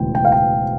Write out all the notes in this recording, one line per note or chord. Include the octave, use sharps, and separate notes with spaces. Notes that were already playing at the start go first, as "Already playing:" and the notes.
Already playing: E1 D2 C#3 E3 G5
G5
F5
G5